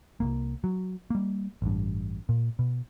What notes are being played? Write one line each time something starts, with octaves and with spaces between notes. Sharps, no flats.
C2 F2 A#3
F#3
G3 A#3
A1 G2
A#2
B2